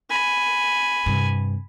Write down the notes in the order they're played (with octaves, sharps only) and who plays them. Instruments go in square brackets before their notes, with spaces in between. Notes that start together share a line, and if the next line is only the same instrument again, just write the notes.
[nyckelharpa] G#5 B5
[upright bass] G2 C3